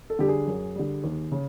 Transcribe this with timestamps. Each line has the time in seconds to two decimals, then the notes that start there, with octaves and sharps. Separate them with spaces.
0.10 A4
0.19 D3 G3 G4
0.28 G#4
0.47 F#2
0.76 D3 G3
1.04 D#2
1.32 C#3